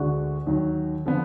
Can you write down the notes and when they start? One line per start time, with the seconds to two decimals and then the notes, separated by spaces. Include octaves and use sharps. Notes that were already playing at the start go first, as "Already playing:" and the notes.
Already playing: D2 D3 G#3 D4 F#4
0.47 D#2 D#3 F#3
1.06 D3 F3 B3